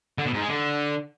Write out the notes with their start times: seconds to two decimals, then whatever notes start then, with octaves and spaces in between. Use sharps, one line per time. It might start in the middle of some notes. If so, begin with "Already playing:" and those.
0.18 D3
0.26 B2
0.34 G#2
0.41 G#3
0.49 D3